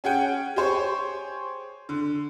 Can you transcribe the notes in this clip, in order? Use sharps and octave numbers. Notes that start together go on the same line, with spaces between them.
C#4 G#4 F#5 G5
G4 G#4 C5 C#5
D3